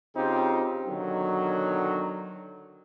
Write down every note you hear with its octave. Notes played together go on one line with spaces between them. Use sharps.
C#3 C4 D#4 F4 G4
B2 D3 D#3 F#3